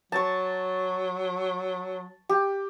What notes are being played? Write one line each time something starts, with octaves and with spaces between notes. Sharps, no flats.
F#3 A5 C#6
G4